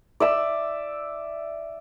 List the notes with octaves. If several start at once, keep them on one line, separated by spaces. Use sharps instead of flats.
D5 E5 E6